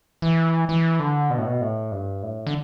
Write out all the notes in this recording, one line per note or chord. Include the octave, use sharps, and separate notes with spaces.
E3
E3
D3
B2
A2
B2
A2
G2
A2
D3